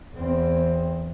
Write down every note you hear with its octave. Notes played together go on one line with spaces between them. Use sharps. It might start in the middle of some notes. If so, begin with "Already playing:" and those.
E2 C4